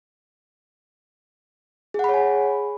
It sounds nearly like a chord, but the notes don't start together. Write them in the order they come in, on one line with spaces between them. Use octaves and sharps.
G#4 F#5 B5 C#5 G#5